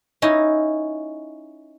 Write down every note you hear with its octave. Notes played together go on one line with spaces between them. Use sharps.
C#4 D#4 E4 D#5